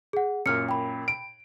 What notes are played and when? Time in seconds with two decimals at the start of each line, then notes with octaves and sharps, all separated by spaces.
0.13 G#4 F#5
0.46 F#2 A#2 F6 C#7
0.69 G5 B5
1.08 D7